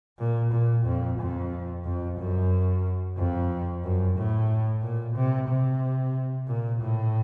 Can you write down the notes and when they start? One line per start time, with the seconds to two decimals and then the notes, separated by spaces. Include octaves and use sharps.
0.19 A#2
0.52 A#2
0.86 F2
1.19 F2
1.84 F2
2.18 F#2
3.18 F2
3.83 F#2
4.16 A2
4.82 A#2
5.15 C3
5.48 C3
6.48 A#2
6.81 A2